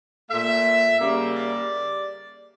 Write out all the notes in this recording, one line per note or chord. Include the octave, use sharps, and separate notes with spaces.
A#2 A3 E5
C#3 G3 A#3
D5